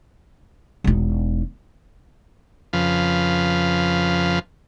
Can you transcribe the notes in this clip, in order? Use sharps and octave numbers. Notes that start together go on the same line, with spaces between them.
E1 D#4
F2 C#3 F3 B4 F5